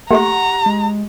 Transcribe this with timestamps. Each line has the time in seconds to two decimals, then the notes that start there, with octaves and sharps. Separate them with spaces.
0.11 A3 A#3 G4 F#5 A#5 C#6
0.66 G#3